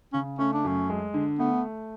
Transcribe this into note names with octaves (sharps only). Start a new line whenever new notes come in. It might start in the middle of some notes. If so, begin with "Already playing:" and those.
C#3 C#4
A3 C#4
D4
F#2 C#4
G#3
D3
A3 B3